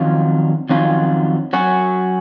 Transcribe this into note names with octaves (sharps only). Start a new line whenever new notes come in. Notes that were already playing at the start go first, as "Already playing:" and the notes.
Already playing: F2 D#3 F#3 C#4 F4
F2 D#3 F#3 C#4 F4
F#3 C#4 F#4